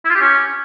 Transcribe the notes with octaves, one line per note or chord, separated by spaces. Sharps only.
E4
F4
G4
C#4